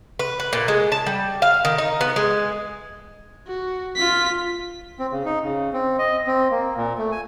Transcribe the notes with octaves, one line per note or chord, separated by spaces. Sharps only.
B4
B4
A#2
G#3
A5
G3
F5
D#3
D#4
B3
G#3
F#4
F4 B6
C4
C#3
D#4
C#3
C4
D#5
C4
A#3
A#2
A3
G#5